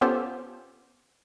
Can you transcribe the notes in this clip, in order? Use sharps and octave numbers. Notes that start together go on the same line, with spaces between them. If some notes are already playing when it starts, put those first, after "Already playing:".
B3 C#4 F4 G4 A4 C5